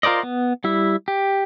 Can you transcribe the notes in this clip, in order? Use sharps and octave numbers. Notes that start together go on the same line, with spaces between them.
F4 A#4 C5 D5 D#5
B3
G3 E4 E5
G4